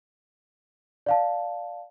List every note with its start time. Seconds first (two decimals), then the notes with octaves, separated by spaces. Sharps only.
1.06 D5 F5 A5